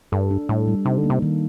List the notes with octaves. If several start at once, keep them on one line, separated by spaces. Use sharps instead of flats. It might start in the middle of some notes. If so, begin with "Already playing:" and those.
G2 A4
D4
A2 G3
G3
C3 D#4
D3
A#3
C3
D#3